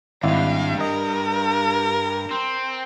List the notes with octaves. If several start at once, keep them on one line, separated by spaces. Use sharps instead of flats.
G#1 E2 G2 E4 D5 F5
A#4 D#5
C4